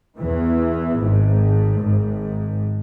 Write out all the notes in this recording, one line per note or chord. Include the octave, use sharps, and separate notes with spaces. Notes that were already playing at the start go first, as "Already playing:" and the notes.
E2 E3
G#1 G#2
G#1 G#2